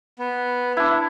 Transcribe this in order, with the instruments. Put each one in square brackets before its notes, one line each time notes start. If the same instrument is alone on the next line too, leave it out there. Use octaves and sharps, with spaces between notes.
[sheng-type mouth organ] B3
[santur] D4 E4